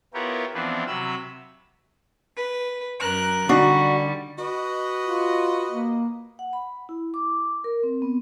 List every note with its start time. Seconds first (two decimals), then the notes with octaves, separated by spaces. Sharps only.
0.14 B3 E4 F4 G4 A#4 C#5
0.54 E3 F3 B3 C4 D4
0.87 C3 F#3 B5 E6
2.37 B4
2.99 F#2 A#4 F#6
3.49 D3 G3 D4 D#4 F#4
4.39 F#4 B4 D#5
5.03 F4
5.68 A#3
6.39 F#5
6.53 B5
6.89 E4
7.14 D6
7.64 A#4
7.83 C4
8.02 B3